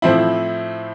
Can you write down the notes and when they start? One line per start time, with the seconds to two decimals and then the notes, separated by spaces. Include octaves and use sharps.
0.02 A2 F3 C4 E4